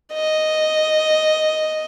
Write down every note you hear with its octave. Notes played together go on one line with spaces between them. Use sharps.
D#5